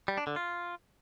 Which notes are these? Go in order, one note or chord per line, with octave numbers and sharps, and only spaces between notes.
G3
D4
D3
F4